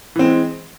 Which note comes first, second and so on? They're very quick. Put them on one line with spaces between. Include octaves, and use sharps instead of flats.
E3 C4 G#3